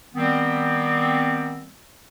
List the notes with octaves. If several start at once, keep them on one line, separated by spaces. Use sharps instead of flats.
D#3 G3 B3 C4